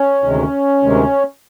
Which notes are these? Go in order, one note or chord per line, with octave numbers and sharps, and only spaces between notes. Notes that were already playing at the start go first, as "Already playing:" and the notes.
Already playing: C#4
D2 C3 D#3 G#3
D2 C3 D#3 G#3